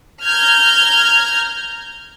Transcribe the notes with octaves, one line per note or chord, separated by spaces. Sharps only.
A#5 F6 G6 G#6